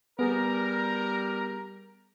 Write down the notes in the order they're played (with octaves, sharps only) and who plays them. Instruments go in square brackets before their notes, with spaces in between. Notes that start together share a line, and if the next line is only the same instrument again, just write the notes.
[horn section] G3 A#4 [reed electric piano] B3 G#4